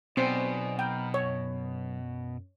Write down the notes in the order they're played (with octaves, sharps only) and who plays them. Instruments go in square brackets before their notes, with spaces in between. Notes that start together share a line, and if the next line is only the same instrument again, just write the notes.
[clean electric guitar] B1 C5 [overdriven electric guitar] B2 [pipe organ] B3 D5 G#5 [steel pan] C4
[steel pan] G5 [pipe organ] A#5 B5 F6
[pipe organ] F#2 [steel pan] C#5